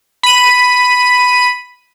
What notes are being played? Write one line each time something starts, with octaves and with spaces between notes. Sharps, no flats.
B5 D#7